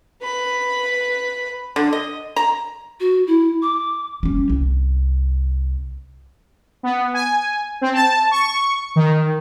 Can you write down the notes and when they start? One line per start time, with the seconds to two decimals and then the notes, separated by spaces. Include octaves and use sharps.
0.21 B4 B5
1.76 D3
1.93 D#5
2.36 A#5
3.00 F#4
3.27 E4
3.62 D6
4.23 G3 C#4
4.50 C2
6.83 B3
7.14 G#5
7.81 C4
7.94 A5
8.31 C#6
8.96 D#3